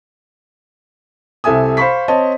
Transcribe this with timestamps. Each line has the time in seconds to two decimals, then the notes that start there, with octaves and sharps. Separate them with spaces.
1.44 C2 C3 A4 E5 G#5 D#6
1.77 C5 F5 B5 C#6 B6
2.08 C4 C#5 D#5 A5